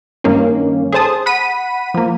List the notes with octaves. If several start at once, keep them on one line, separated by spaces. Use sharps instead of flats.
G2 D#3 A#3 C#4
G#4 A4 C5 A5 D#6
F#5 B5 B6 D#7
F3 A#3